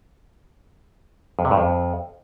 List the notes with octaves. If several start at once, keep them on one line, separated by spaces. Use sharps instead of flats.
F2
C3
G2
F2